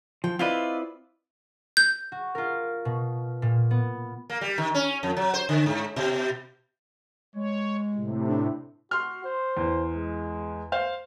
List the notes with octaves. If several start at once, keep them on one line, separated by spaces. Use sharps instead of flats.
F3 G5
C4 E4 F4 B4 D5 D#5
G6
F#4
F4 A#4
B2
A#2
B3
A#3
G3
D#3
C#4
F2
F#3
C5
D3
G#2
B2
G#3 C#5
A2 C3
D4
F#4 C6 F6
C5
E2
G#3
C5 F5